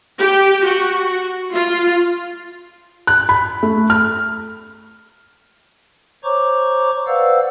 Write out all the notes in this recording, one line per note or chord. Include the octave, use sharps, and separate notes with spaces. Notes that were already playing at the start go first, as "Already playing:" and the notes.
G4
F#4
F4
F#6
B5
A3
F6
C5 C#5 A#5 C#6 D6
B4 C5 D5 F5 F#5 E6